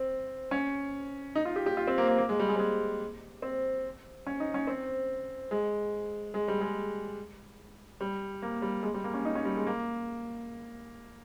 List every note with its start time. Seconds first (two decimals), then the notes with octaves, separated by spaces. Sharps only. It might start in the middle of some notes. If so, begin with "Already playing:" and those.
Already playing: C4
0.51 C#4
1.35 D#4
1.45 F4
1.56 G4
1.66 G4
1.77 F4
1.87 C4
1.98 A#3
2.08 A#3
2.18 A#3
2.29 G#3
2.39 G3
2.49 G#3
2.56 G3
2.59 G#3
3.42 C4
4.27 C#4
4.40 D#4
4.54 C#4
4.67 C4
5.51 G#3
6.34 G#3
6.48 G3
6.61 G#3
8.01 G3
8.42 A#3
8.62 G3
8.83 G#3
8.94 G3
9.04 A#3
9.14 C#4
9.25 D#4
9.35 C#4
9.45 G3
9.57 G#3
9.67 A#3